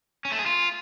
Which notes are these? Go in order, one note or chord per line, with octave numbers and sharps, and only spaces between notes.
C#4
A3
G#4
F4